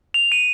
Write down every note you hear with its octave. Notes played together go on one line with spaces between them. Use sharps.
F7
D#7